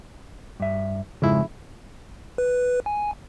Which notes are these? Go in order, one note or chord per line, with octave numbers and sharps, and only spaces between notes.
G2 E5
F2 G#2 C#3 G#3 E4
B4
G#5